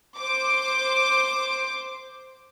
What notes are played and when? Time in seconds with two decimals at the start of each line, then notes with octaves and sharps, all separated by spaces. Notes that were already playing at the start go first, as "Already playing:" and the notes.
0.18 C5 D6